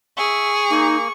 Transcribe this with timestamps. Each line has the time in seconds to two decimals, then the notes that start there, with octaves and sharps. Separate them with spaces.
0.17 G#4 E5 C#6
0.70 A#3 D#4